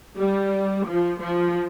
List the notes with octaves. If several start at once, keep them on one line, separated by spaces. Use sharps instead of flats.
G3
F3
F3